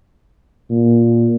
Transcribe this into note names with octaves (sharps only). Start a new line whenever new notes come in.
A#2